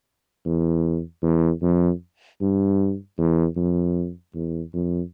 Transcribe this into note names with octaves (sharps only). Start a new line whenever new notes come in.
E2
E2
F2
G2
E2
F2
E2
F2